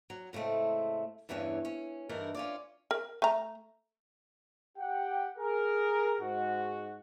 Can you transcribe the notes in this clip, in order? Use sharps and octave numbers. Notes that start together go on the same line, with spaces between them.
F#3
A2 C#3 G#3 A3 C4
E2 G2 C#3 E3 C#4
C#4
G2 E3 D#4 G#4 A#4
C#4 F4 D5
A#4
A3 A#5
G4 F#5 G5
G#4 A#4
G#2 F#4